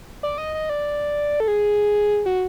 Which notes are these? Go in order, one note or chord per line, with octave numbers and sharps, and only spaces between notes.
D5
D#5
D#5
D5
A4
G#4
F#4